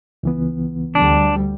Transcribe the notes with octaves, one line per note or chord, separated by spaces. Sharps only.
C#2 E3 B3
D2 G3 D4